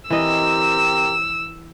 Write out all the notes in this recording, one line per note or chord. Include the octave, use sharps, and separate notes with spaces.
E3 C4 G4 A#4 D#5 E6